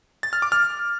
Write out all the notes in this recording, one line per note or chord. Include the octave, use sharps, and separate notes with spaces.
A6
F6
D6
F6